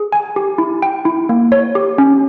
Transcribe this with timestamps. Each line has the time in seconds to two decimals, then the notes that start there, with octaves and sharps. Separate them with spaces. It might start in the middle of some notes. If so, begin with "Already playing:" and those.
Already playing: G#4
0.12 G#5
0.36 G4
0.58 E4
0.82 G5
1.05 E4
1.29 A#3
1.52 C#5
1.75 G4
1.98 C#4